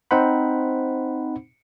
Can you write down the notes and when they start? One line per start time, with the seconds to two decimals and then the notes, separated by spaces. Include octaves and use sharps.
0.11 C4 D#4 C5 F#5 B5